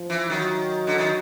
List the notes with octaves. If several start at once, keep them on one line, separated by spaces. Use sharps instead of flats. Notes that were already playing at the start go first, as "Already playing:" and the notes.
Already playing: F3
E3
D#3 F#3
D3
D#3